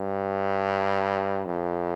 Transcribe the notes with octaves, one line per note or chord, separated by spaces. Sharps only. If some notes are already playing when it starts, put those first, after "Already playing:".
Already playing: G2
F2